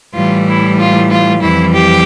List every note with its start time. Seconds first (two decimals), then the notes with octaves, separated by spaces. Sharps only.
0.14 A2 E3 G3 F4
0.47 E4
0.79 F4
1.10 F4
1.42 F2 E3 G3 E4
1.73 G4